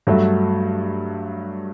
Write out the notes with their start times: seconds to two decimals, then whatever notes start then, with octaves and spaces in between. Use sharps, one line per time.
0.07 G2 F#3 A3